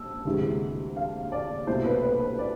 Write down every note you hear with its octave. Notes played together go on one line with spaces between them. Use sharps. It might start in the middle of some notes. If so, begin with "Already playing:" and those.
Already playing: E6
D2 C3 E3 G#3
F5
D5
C2 B2 A3 E4 C5
B4
B4
C5
D5